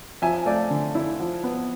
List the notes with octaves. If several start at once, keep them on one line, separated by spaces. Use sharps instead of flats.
F3 E5 G#5
A3 D5 F5
D3
E4
F3
B3